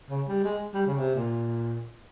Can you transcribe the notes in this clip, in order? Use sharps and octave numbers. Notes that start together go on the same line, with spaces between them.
C#3
G3
G#3
G3
C#3
C3
A#2